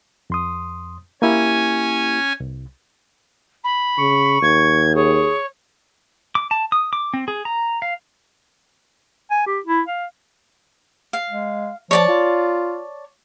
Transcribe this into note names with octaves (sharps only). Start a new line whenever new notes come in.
F2 C6 D#6
A#3 C#4 E4 G4 G#5
C2
B5
C#3 C#6
D#2 G#6
G#4 C#5
D6
A5
D#6
D6
C4
G#4
A#5
F5
G#5
G4
E4
F5
F5
G#3
F3 C#5 D5 A5
F4